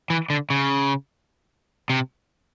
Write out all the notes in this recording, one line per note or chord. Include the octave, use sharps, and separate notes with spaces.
E3
D3
C#3
C3